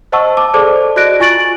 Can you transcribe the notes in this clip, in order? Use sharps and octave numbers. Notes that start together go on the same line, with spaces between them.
C5 D#5 F#5 A5 C#6 E6
A5 D6
G#4 A4 C5 D5 A5 D6
F#4 D5 D#5 F#6 A#6 D7
F4 G#5 C#6 A6 D7 F#7